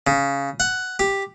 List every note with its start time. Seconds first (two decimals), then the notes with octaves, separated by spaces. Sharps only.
0.07 C#3
0.60 F#5
0.99 G4